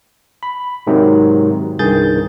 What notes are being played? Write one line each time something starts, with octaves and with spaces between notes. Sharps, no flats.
B5
G#2 C3 D#3 F#3
C2 G2 D#3 G#4 G6 A6